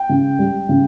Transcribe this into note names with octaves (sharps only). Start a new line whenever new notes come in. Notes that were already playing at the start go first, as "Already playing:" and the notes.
Already playing: G5
C#3
G3
C#3